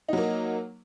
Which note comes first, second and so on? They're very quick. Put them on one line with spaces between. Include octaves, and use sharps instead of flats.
D#4 F#3 A#3